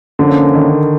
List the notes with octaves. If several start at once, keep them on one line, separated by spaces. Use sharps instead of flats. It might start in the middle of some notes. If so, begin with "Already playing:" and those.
D3 F3 A#3 C#4
D#3